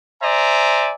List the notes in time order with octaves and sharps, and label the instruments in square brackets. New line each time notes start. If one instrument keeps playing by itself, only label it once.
[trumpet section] C5 D5 E5 G#5 A#5